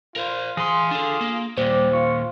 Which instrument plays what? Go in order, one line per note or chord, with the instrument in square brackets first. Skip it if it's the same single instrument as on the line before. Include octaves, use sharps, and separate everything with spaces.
[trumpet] F4 [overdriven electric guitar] A#4 C5
[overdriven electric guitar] E3 C6 [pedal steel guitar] G#4
[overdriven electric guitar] D4 A4
A#3
[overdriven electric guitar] D#2 A#2 [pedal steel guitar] G3 [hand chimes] C5
[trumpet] F4 [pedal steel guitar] C#6